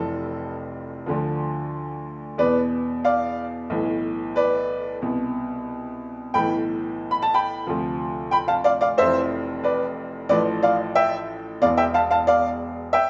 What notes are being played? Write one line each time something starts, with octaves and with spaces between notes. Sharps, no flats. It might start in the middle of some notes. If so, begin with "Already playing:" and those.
Already playing: F1 F2 C3 E3 A4
D2 D3 F3
E2 B2 B4 D5
D5 F5
B1 A2 E3
B4 D5
C2 B2
B1 A2 E3 G5 B5
B5
A5
G5 B5
D2 C3 F3
G5 B5
F5 A5
D5 F5
D5 F5
F1 F2 E3 C5 E5
B4 D5
A1 A2 F3 B4 D5
D5 F5
E5 G5
E1 E2 B2 D5 F5
E5 G5
F5 A5
F5 A5
D5 F5
E5 G5